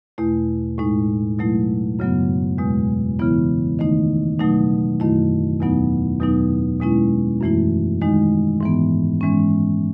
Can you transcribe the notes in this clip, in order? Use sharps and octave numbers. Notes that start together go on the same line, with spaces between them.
E2 B2 A3 E4
A2 G#3 D#4
B2 F#3 A3 E4
F#2 C#3 F#3 B3
E2 B2 G#3
C#3 E3 B3 E4
D#3 A3 D#4
B2 F#3 A3 D#4
F#2 D#3 A3 E4
E2 B2 F#3 B3 D#4
E2 B2 F#3 B3 D#4
B2 G#3 C#4 E4
F#2 E3 A3 E4
D#3 G#3 D#4
G#2 E3 B3
G#2 E3 G#3 C#4